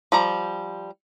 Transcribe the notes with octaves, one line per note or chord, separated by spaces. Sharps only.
F3 G3 A#5